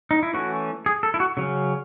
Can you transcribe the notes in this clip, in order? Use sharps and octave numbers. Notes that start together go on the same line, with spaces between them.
D#4
E4
E3 A3 C#4 F#4
G#4
A4
E4
F#4
C#3 F#3 C#4